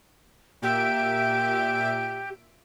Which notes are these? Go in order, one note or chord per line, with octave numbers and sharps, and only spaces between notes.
A#2 G4 E5 D7